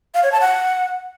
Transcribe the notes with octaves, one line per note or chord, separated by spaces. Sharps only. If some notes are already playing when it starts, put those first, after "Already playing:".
F5
C#5
A5
F#5